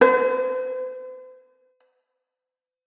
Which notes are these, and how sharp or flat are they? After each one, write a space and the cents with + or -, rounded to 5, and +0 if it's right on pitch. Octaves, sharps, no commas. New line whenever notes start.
C5 -40